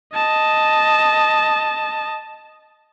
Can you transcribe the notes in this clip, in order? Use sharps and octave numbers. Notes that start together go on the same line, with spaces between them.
D#5 A5